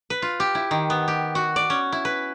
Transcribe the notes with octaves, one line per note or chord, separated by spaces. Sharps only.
B4
F4
G4
E4
D#3
B3
G4
F#4
D5
C#4
E4
B4